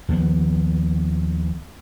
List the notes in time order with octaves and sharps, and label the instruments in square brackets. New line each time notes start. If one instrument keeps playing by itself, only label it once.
[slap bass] D#2 F3 G#3 B3